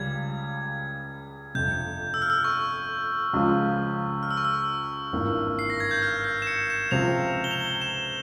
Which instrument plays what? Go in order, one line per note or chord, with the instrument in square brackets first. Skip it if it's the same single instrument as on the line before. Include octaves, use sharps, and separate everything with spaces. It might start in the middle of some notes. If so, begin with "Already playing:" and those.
Already playing: [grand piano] C#2 C#3 G3 [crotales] G#6
[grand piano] G1 F2 C3 [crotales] G6
[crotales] E6
F6
E6
C#6
[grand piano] C#2 C#3 F3 G#3
[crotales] F6
E6
C#6
E6
[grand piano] G#1 G2 E3 A#3 F4
[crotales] C7
A#6
G#6
G6
F6
G6
E7
C#7
E7
[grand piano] C#2 C3 F3 C4 [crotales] F7
[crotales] G7
F7
E7